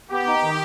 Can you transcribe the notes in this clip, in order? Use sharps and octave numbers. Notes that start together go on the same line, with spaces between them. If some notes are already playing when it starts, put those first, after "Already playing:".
B3 G4
D#4
D#3